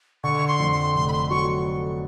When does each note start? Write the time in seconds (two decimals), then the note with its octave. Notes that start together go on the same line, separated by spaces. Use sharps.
0.24 D3 C#6
0.47 C6
0.60 F2
0.72 C6
0.95 F1 C6
1.08 B5
1.13 C6
1.30 F#3 C#6